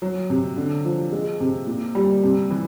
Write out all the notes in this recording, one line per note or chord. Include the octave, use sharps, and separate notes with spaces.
F#3
C3
D3
F3
G#3
C3
A#2
G3
C3
E3